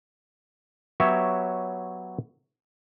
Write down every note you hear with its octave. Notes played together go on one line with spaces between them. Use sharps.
F#3 B3 G4 C#5 E5